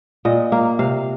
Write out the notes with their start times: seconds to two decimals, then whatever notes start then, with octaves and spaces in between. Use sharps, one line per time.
0.25 A#2 D#5
0.52 A#3 F5
0.79 C3 F5